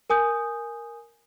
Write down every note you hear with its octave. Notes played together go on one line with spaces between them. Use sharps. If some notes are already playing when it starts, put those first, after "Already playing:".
A#4 G#5 D#6 G6